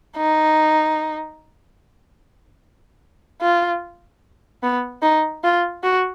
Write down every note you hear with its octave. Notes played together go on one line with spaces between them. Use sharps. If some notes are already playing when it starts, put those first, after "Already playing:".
D#4
F4
B3
D#4
F4
F#4